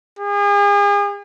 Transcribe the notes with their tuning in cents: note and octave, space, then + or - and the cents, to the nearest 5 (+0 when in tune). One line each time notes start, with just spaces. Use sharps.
G#4 -40